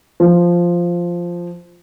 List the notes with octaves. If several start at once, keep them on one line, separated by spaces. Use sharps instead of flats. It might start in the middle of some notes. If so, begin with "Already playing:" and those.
F3